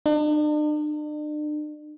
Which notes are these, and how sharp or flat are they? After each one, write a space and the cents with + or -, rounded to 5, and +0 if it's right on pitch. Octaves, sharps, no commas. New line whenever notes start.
D4 +45